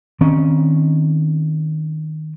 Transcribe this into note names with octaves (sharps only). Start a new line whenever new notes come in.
D#3 C4 C#4